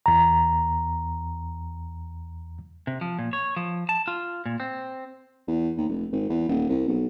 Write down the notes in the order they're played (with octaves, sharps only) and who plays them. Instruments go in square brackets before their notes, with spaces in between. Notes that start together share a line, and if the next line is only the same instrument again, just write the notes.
[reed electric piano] E2 A#5
[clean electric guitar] C3
F3
A#2
C#5
F3
A5
F4
A#2
C4
[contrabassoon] E2
D#2
F1
G#1
E2
D#1
C2
B1